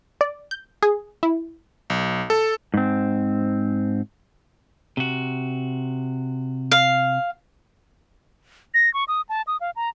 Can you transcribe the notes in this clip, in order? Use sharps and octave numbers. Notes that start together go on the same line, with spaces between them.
D5
G6
G#4
E4
B1
A4
G#2 C4
C3 F#4
F5
A#6
C#6
D#6
A5
D#6
F5
A#5